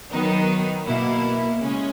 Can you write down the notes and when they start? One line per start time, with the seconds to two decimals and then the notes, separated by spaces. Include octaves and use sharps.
0.10 D#3 F#3 B3 D#4
0.85 B2 A#3 E4
1.59 C#3 G#3 C#4